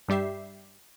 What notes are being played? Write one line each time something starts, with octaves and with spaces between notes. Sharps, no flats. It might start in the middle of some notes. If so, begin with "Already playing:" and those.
G2 G3 G4 E5 C7